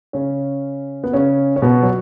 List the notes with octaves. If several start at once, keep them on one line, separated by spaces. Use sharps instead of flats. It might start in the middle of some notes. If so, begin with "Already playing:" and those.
C#3 C#4
B3
C#3 C#4
C#4
B2 B3
F#3